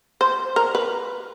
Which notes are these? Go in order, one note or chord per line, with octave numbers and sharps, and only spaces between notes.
C5
A#4
B4